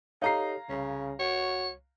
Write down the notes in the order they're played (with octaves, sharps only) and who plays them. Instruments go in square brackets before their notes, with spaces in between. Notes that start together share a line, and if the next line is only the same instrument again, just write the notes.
[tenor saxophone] D#4 [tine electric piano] G4 A4 C#5 [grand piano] F5 A#5 C7
[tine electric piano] C2 [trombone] C#3 [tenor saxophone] C#4
[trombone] F#4 [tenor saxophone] C#5